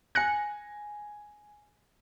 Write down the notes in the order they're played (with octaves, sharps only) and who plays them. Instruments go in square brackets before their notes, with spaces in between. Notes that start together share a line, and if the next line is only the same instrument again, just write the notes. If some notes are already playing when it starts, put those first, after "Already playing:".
[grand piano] G#5 A#6 [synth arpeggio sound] F#6 C#7